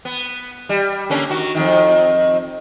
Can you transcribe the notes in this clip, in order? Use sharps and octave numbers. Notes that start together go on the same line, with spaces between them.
B3
G3
D3 A#3 C#4
D#3 F#4
F2 A2 D#3